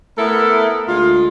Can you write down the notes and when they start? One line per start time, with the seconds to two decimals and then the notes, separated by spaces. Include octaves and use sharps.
0.18 A3 B3 E4 A4 A#4
0.89 D2 G#3 F4